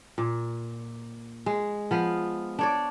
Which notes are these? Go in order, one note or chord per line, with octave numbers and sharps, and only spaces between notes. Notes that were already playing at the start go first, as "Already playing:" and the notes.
A#2
G#3
F3 B3 F5
D4 C#5 D5